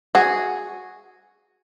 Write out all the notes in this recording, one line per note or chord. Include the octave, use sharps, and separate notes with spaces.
F#4 G#4